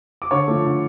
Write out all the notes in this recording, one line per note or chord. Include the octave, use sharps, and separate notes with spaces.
D6
D3 C#5 C#6
F3 A3
D3